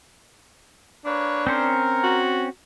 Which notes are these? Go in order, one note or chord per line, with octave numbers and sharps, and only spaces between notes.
A#3 D4 B4 C#5
C4 C#4 A#4 C5
F#4